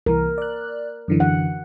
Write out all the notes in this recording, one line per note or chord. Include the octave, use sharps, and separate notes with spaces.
C2 E3 A#4
D5 F#6
F#2 D3 E3
F#5